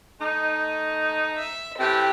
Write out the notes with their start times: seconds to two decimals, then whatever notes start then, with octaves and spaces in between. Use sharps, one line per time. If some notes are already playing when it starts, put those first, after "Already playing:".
0.20 A3 D#4
1.37 E5
1.79 A2 E3 C4 G4